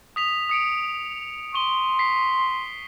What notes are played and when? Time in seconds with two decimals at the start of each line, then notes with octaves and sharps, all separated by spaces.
0.16 D#6 B6 F7
0.49 D#6 C#7 D7
1.54 C6 C#6 G7
1.99 B6 C7